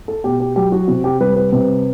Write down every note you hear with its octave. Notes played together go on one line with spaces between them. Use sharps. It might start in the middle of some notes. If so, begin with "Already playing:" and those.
A4
B2 G4
G4
F#3 G4
F#4
C3 F#4
G4
G3 B4
B4
C3 B4